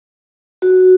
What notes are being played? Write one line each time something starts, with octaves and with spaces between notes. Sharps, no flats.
F#4